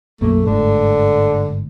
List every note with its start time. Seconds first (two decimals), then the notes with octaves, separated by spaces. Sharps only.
0.21 B1 F#2 A3 A#3
0.46 G1 G#2 D3 A3